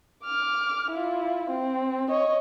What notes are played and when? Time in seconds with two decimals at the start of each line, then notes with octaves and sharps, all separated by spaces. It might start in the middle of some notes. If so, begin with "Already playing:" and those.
0.25 D6 F6
0.91 E4 F4
1.50 C4
2.09 C#5 D#5